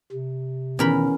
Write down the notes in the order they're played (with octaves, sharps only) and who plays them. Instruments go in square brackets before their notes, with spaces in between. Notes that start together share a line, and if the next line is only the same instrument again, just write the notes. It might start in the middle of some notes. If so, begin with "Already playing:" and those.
[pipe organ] C3
[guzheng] E2 A#4 B5 [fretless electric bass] B2 D#3 [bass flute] C#4